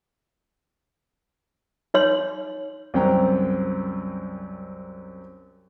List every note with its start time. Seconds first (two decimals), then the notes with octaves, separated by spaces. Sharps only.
1.94 D#4 C#5 C6
2.94 C2 F#2 C4 C5 G5 A#5